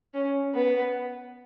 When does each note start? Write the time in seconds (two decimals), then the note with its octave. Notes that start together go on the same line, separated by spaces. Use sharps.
0.14 C#4
0.55 B3